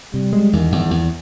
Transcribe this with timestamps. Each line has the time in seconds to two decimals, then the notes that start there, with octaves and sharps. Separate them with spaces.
0.14 C3 G3
0.33 G#3
0.52 E2 D#3
0.72 E2
0.91 E2